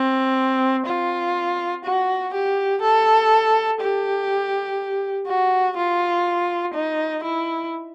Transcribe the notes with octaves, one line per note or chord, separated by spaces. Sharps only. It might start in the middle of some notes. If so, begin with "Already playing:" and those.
Already playing: C4
F4
F#4
G4
A4
G4
F#4
F4
D#4
E4